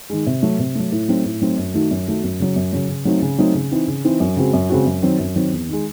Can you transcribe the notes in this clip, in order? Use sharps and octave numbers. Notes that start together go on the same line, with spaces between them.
D#3 G#3
C3
F#3 A3
C3
F#3 A3
A2
F#3 A3 C4 D#4
A2
F#3 A3 C4 D#4
F#2
D#3 A3 D#4 F#4
F#2
D#3 A3 D#4 F#4
F#2
C#3 F#3
F#2
C#3 F#3
C#3
F#3 A3 C4 D#4
C#3
F#3 A3 C4 D#4
C#3
E3 C4 D#4
C#3
E3 C4 D#4
F#2
C#3 G#3 C4 F#4
F#2
C#3 G#3 C4 F#4
F#2
D#3 F#3 C4
F#2
D#3 F#3 C4
E2
D#3 G#3